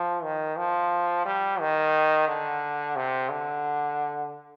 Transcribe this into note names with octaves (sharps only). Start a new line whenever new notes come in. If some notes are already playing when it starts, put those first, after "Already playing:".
Already playing: F3
D#3
F3
G3
D#3
D3
C3
D3